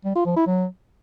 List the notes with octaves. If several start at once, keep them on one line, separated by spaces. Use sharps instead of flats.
G3
F4
F3
E4
F#3